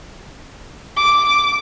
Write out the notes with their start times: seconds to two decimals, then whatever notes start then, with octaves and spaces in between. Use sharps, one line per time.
0.97 D6